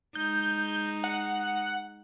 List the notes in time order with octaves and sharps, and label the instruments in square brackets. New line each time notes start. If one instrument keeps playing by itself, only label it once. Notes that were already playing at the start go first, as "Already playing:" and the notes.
[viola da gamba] G#3 D#4 [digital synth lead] G6
[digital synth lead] F#5